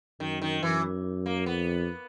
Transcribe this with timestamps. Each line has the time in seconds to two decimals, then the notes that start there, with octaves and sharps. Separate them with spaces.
0.20 F#2 D#3
0.42 D#3
0.63 F#2 E3
1.26 A#3
1.46 F2 B3